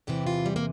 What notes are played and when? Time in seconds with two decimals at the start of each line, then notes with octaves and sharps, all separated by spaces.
0.07 E2 C3 E3 G4
0.27 F4
0.46 G3
0.56 A#3